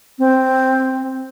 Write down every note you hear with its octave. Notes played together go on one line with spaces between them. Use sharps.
C4